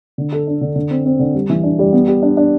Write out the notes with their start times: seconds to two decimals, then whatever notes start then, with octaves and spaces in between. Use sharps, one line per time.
0.18 D3
0.32 A4
0.47 D4
0.61 D3
0.76 D3
0.90 C4
1.05 C4
1.19 D3
1.35 G3
1.50 E3
1.63 D4
1.79 G3
1.93 B3
2.08 G4
2.22 D4
2.37 D4